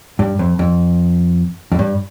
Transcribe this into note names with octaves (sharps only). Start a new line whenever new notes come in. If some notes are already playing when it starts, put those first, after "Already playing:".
G2
F2
F2
F2
G2